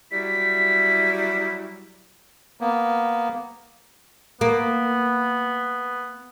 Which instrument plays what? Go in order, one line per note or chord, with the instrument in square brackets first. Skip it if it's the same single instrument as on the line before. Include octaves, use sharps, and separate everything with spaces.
[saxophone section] F#3 G3 E4 [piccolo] B6
[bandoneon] A#3 B3
[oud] A#3 [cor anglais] B3